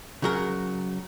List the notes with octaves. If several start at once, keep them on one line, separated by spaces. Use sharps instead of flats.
C#3 F#3 A#4